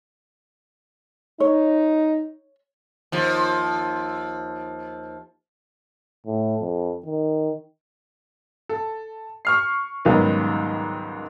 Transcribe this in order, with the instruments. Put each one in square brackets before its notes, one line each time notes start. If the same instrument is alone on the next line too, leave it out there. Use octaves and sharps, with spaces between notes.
[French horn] D#4 [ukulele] C#5
[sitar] D#2 F3
[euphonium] A2
F2
D#3
[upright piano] A4
C#6 F6 C7
C#2 G#2 D#3 F#3 G3 B3